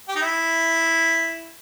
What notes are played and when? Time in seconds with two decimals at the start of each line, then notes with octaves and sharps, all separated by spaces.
0.09 G4
0.16 D#4
0.22 E4